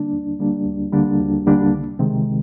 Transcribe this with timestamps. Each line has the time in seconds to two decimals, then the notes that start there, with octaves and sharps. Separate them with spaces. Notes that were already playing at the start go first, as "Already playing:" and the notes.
Already playing: D3 G3 A#3 D4
0.12 D2
0.39 D3 G3 A#3 D4
0.66 D2
0.92 D3 G3 A#3 D4
1.20 D2
1.47 D3 G3 A#3 D4
1.73 C2
1.99 C3 D#3 G#3 C4